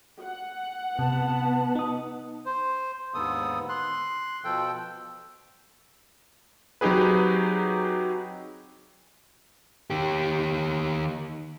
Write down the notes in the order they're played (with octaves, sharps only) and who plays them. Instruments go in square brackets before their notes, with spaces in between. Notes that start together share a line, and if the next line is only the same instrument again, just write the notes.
[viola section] F#5
[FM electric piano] C3 [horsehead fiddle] B3 [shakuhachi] A5
[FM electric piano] D#4 D#6
[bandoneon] C5
D#2 G#2 D3 B3 A4 D#6
C6 F#6
B2 F3 A4 G5
[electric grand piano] F#3 C4 D#4 G4 G#4 B4
[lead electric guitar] D#3 G4